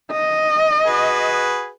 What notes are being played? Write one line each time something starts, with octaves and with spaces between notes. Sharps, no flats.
D#5
F#4 G#4 B4